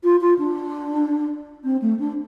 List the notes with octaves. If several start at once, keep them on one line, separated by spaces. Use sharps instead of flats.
F4
F4
D4
C4
A3
D4